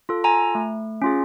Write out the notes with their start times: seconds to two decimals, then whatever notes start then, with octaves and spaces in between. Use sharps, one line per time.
0.09 F4 A4
0.24 G#5 A#5
0.55 A3
1.02 C#4 F4 G#4